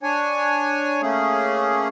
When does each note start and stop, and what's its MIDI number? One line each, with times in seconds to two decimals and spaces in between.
0.03 1.01 62
0.03 1.01 73
0.03 1.01 80
1.02 1.88 57
1.02 1.88 58
1.02 1.88 61
1.02 1.88 68